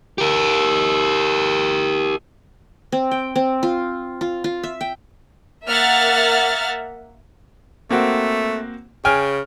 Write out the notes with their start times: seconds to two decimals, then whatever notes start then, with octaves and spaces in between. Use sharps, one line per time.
0.18 G4 A#4
2.92 C4
3.11 G5
3.36 C4
3.63 F4
4.21 F4
4.44 F4
4.63 E5
4.81 G5
5.67 A#3 E5 F#5 F6 A6
7.91 A3 A#3 C4 F#4
9.05 C#3 G5 G#5 F6